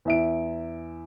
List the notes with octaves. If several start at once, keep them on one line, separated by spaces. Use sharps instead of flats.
E2 E5 D7